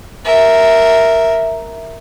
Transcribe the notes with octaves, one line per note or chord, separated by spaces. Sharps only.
A#4 E5